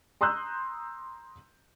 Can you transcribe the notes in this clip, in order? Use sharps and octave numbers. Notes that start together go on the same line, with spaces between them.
A#5 C6 D#6 E6 F#6 G6